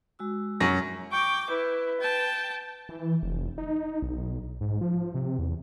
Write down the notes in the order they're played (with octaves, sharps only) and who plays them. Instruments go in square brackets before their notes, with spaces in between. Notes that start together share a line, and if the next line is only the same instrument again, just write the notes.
[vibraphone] G#3 F#4 E6
[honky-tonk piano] F#2 C#6 A#6
[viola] G5 D6 [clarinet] C#6
[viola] E4 [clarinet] B4
[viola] G5 A5
[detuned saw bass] E3
F1
D#4
B1
G#2
F3
C3
E2